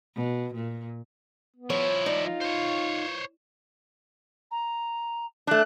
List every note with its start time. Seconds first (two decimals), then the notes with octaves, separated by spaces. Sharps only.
0.15 B2
0.54 A#2
1.56 B3
1.70 F3 E4 C#5
2.06 D#4 D5
2.26 F4
2.41 C5 C#5
4.51 A#5
5.47 A3 D4 F#6